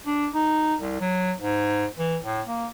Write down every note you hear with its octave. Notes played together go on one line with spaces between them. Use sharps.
D4
D#4
C2
F#3
G#2
E3
A2
A#3